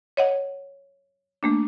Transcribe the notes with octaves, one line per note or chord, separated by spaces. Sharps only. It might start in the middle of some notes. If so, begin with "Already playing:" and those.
C#5 D#5 F#5
A3 A#3 D4